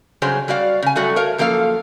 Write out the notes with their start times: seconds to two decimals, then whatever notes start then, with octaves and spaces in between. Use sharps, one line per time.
0.22 G2 C#3 F#3 G#4 C5
0.48 G3 F#4 D5 F5
0.82 C#3 G#5
0.96 F#3 G3 A3 F#4
1.16 A#4 C#5 F5
1.38 F#2 F3 A#3 A4 F5